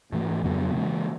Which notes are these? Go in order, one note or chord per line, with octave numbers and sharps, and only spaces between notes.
G#2 E3 A3
F2 C#3 F#3 B3
C#3 E3 G#3 C#4